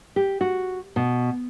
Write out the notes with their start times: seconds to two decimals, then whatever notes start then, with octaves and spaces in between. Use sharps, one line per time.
0.16 G4
0.41 F#4
0.96 B2